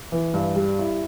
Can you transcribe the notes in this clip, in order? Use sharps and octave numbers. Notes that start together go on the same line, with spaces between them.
E3
G2
G3
E4